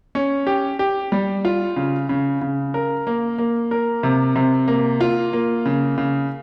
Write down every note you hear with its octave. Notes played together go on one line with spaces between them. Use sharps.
C#4
G4
G4
G3
F4
C#3
C#3
C#3
A#4
A#3
A#3
A#4
C3
C3
A#3
F4
A#3
C#3
C#3